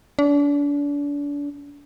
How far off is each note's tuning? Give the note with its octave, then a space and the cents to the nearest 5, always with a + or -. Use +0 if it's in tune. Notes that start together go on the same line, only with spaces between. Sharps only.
D4 -35